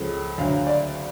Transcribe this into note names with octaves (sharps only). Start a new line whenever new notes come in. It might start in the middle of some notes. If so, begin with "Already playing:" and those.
Already playing: C#2 C#3 F3 A4
D2 D3 F#3 F5
D5